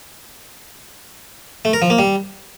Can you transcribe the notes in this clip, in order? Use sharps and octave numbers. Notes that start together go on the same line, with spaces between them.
A3
A#4
F3
A#3
G3